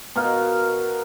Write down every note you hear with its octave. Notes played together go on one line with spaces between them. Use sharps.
B2 A#4 F5